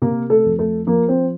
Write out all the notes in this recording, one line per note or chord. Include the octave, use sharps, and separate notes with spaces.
C3 A#3 A#4
A3 A4
F2
A3 A4
F3 A#3 A#4
C4 C5